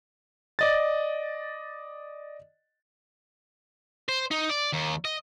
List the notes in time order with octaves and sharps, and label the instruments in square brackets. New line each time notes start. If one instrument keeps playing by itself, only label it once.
[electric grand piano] D5 D#5 A6
[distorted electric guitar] C5
D#4
D5
D#2
D#5